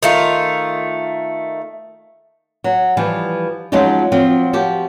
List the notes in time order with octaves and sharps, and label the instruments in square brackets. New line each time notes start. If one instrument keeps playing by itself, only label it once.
[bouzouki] D#3 A3 F4
[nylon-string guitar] F#3
E3 F3 G3
F3 F#3 G#3 C#4 D#4 F4
F3 F#3 C4
F3 F#4 G4